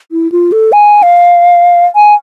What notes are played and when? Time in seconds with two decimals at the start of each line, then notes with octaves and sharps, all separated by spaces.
0.12 E4
0.32 F4
0.52 A4
0.72 G#5
1.03 F5
1.96 G#5